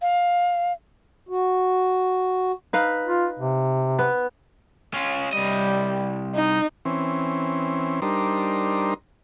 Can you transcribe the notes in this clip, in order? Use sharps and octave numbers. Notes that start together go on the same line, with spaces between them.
F5
F#4
D#4 B4 F5
F4
C3
B3
C#4 F4
C2 G3 D#5
D#4
E3 C4 C#4
G3 D4 D#4 A#4 C5